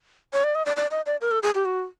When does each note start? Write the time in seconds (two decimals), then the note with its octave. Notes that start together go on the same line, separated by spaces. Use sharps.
0.33 C#5
0.44 D5
0.55 D#5
0.66 D5
0.76 D5
0.91 D#5
1.06 D5
1.21 A#4
1.31 A4
1.43 G#4
1.55 G4
1.65 F#4